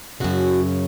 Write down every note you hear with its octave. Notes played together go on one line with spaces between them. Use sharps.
F#2 C#3 F#4